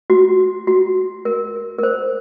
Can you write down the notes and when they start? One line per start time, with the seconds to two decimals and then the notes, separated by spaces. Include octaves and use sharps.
0.10 F#4
0.67 F#4
1.25 A#4
1.78 A#4
1.83 C5